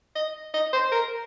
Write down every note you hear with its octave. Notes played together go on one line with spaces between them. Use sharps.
D#5
D#5
C5
A#4